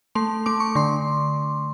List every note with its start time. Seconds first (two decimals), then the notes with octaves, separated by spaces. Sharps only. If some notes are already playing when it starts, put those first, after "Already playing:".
0.15 A3 C6
0.46 A3 D6
0.60 C#6
0.75 D3 C6